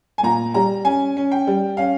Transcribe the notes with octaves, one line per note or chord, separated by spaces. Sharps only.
G#5
A#2 A#5
G3 A#5
C#4 G#5
C#4
G5
G3
C#4 F5